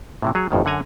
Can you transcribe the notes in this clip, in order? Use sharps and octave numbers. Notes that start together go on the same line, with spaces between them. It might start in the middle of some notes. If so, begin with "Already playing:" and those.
A2 C3 E3
F#3 G#4 C#5
G1 F2 A2 D#3
F#2 D3 F#5 G#5 A#5